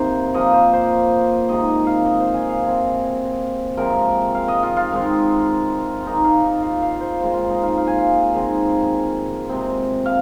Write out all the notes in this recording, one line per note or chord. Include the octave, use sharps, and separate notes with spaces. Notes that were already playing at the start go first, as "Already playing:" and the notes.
Already playing: C3 D#3 A#3 C5
A#2 F3 A#3 D#5
C5
C5
C3 D#3 G#3 D#5
D#5
F5
D#5
C5
G#5
F5
C3 F3 C4 G#5
C3 F3 G#3 C4 A#4
F5
D#5
F4
F4
D#3 G#3 C4
A#2 A#3 D#4
F4
D#4
F4
F5
C5
A#2 G#3 C4
F4
D#4
F4
F5
G#5
F5
D#3 G#3 C4
C3 G#3 C4
F5